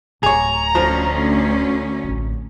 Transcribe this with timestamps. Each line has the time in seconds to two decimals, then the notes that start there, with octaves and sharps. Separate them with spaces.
0.23 D1 G#4 C#5 A#5
0.75 D2 F3 C#4
2.04 A1 C4